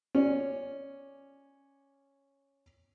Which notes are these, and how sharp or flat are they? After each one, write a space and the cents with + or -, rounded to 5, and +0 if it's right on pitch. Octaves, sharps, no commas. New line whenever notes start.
C#4 -5 D5 +0